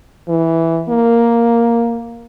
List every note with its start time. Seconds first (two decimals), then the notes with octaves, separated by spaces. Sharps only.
0.28 E3
0.89 A#3